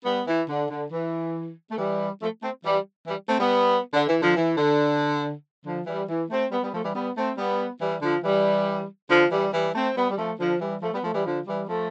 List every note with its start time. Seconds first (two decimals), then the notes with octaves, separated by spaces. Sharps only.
0.05 G3 B3
0.27 E3
0.49 D3
0.70 D3
0.91 E3
1.70 A3
1.78 E3 G3
2.21 F3 A3
2.42 A3 C4
2.64 E3 G3
3.07 E3 G3
3.28 A3 C4
3.39 G3 B3
3.94 D3
4.07 E3
4.22 D3 F3
4.37 E3
4.58 D3
5.66 D3 F3
5.87 E3 G3
6.09 E3
6.30 A3 C4
6.52 G3 B3
6.62 G3 B3
6.73 F3 A3
6.84 E3 G3
6.95 G3 B3
7.17 A3 C4
7.38 G3 B3
7.81 E3 G3
8.02 D3 F3
8.24 E3 G3
9.10 D3 F3
9.32 E3 G3
9.53 E3 G3
9.75 A3 C4
9.96 G3 B3
10.10 G3
10.18 F3 A3
10.39 D3 F3
10.61 E3 G3
10.82 F3 A3
10.93 G3 B3
11.04 F3 A3
11.15 E3 G3
11.25 D3 F3
11.47 E3 G3
11.69 F3 A3